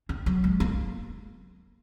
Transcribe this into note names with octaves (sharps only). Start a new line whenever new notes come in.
C4
F#3
G#3
A#3